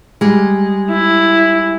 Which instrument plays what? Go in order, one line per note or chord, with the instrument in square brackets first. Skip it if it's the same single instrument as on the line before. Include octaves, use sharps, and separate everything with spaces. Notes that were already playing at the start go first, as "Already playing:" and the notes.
[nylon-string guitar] G3 G#3
[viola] E4